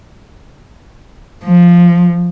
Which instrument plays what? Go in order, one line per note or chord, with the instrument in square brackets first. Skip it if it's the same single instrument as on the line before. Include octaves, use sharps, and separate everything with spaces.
[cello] F3